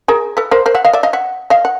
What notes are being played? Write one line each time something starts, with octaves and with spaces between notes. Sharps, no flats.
G#4 A#4
A4 B4
A#4 C5
A#4 C5
E5 F#5
D#5 F5
D5 E5
D#5 F5
E5 F#5
D#5 F5
F#5